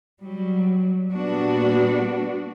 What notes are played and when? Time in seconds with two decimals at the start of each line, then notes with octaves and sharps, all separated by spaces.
0.21 F#3 G3
1.12 A#2 G3 B3 D4 F#4